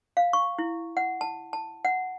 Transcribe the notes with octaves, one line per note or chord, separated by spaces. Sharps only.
F5
C#6
E4
F#5
A5
A5
F#5